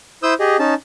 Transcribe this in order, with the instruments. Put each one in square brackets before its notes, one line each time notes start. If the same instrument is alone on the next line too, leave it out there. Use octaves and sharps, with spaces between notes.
[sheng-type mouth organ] E4 C5 D#6 E6 G6
G4 G#4 D#5
C#4 D#4 A5